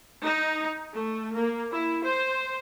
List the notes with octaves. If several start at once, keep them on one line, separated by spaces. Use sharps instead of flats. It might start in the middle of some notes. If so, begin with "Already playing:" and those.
D#4
A3
A#3
E4
C5